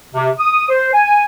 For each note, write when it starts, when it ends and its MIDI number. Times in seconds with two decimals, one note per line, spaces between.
0.15 0.30 48
0.39 0.66 87
0.69 0.89 72
0.93 1.24 80